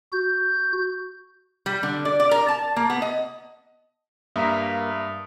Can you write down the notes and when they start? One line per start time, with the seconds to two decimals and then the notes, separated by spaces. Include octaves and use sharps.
0.13 F#4 G6
1.66 G3
1.83 D3
2.05 D5
2.20 D5
2.31 A#4
2.48 A5
2.76 A#3
2.90 B3
3.02 D#5
4.36 G2 A#3 E5 A#5 D#6 B6